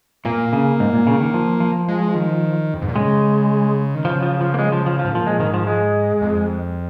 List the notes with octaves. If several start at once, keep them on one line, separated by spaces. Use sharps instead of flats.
A#2 A#3
C#3
G#2
A#2
C#3
D#3
F3
F3
G#3
D#3
F2
G#2
A#2
C#3 G#3
D#3
C#3 F3
F3
F3
A#3
G#3
F3
F3
F3
G#2
A#2 F3
G#3
G#2 D#3
F3
G#3
F2